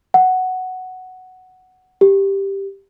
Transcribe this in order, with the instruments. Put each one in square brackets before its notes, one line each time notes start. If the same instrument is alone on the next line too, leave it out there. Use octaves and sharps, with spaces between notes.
[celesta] F#5
G4